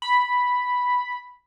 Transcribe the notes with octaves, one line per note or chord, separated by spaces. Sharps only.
B5